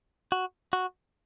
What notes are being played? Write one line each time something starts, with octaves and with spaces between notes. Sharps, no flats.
F#4
F#4